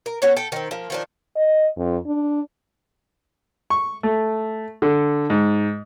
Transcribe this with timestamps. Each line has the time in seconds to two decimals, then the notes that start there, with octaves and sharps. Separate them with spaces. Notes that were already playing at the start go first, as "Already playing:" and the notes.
0.06 A#4
0.22 B3 C#4 F#4 C#5
0.36 A4 G5
0.52 D#3 C4
0.71 F3 A#3
0.90 D#3 F3 D4
1.36 D#5
1.77 F2
2.06 D4
3.70 C#6
4.03 A3
4.82 D3
5.30 G#2